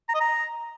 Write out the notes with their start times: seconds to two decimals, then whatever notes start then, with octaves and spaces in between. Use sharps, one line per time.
0.09 A#5
0.15 D#5
0.21 A#5